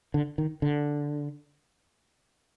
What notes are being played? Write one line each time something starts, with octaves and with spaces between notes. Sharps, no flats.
D3
D#3
D3